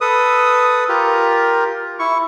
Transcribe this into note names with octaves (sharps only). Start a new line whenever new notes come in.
A4 B4 D#6
F4 G4 A#4
E4 C#6